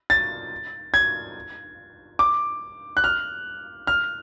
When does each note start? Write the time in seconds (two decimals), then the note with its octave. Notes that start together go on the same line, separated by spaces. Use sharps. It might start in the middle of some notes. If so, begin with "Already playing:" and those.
0.10 A6
0.94 G#6
2.19 D6
2.97 F#6
3.04 F6
3.87 F6